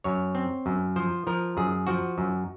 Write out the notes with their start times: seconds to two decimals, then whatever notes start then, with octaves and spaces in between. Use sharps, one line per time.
0.04 F#2 C#5
0.35 C4
0.66 F#2
0.96 F3 C5
1.27 F3 A#4
1.57 F#2 G#4
1.87 F3 F#4
2.18 F#2